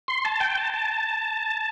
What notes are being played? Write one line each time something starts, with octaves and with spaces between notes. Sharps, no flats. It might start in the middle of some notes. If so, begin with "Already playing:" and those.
C6
A5
G5
A5
A5